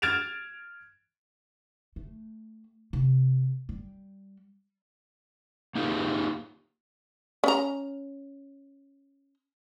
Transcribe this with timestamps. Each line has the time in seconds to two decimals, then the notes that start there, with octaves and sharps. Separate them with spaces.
0.02 F6 G#6 A6 D7 E7 F7
1.96 A3
2.93 C3
3.69 G3
5.75 A#3 D#4 F4 G4 G#4
7.44 C#4 A#5